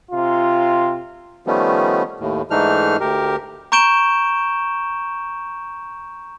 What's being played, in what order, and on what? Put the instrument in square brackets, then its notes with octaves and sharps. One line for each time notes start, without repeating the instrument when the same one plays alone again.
[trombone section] C3 F4
[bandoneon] D#3 F3 G3 A3 B3 C#4
D#2 A2
G#2 E3 A3 D4 D#4 F6
D2 G4 A#4
[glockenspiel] A#5 C#6 G6 D7 E7 G7